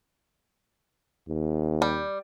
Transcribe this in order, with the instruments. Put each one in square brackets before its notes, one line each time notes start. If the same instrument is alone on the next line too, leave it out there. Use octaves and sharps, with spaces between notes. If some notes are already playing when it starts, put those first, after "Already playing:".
[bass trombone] D#2
[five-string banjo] G3